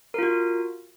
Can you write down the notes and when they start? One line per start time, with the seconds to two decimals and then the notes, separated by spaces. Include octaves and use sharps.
0.14 A#4
0.18 F4
0.23 F#4